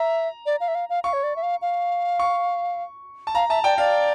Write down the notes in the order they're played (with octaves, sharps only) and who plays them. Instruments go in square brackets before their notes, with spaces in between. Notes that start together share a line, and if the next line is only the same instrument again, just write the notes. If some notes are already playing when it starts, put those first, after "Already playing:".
Already playing: [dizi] E5 [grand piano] A#5
[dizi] D5
F5
E5
F5
F5
[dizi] F5 [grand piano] C#6
[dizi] C#5
D5
E5
F5
F5
[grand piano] C#6
A5
[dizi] F5 [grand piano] A#5
[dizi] E5 [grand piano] A5
[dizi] D5 [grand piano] G5
[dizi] D5 [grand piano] F5